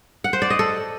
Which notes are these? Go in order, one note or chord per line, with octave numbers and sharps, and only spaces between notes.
F#5
C5
D5
D#5
A4